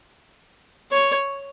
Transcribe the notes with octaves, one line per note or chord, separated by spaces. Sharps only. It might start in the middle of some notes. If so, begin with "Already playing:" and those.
C#5